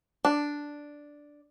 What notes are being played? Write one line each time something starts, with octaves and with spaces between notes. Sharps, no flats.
D4